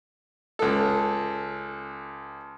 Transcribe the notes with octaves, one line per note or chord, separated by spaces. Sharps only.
C#2 A4